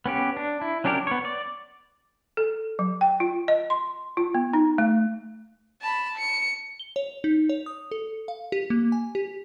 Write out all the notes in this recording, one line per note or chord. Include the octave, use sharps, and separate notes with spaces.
B3 C#4 G4
D4
E4
F#3 C#4 D4 G4 A#4
B3 C#5
D5
A4
F#3
G5
F4
D#5
C6
F4
B3
D#4
A3
A5 B5
C#7
G7
C#5
D#4
C#5
D#6
A4
F5
G4
A#3
G#5
G4